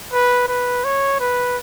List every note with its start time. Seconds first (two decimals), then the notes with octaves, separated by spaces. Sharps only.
0.13 B4
0.48 B4
0.85 C#5
1.20 B4